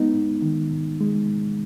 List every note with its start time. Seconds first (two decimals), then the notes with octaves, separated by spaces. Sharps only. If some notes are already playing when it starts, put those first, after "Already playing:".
Already playing: G#3 B3 D#4
0.13 G#2
0.42 D#3
0.71 G#2
1.01 G#3
1.30 G#2